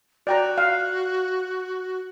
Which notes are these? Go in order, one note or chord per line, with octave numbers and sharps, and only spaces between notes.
F#4 D5 G5 A#5
F5